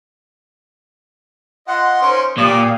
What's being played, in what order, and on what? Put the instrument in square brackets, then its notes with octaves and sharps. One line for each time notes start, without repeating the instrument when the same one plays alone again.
[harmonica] F4 D#5 [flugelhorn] F#5 [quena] C6
[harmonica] C#4 D#4 A#4 [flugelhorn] C5
[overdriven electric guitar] A#2 [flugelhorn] G4 [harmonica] D5 D#6 [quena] F5